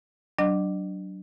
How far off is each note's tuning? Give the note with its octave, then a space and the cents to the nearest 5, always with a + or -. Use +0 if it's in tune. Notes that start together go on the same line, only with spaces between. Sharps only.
F#3 +25 D4 +0 D#5 -40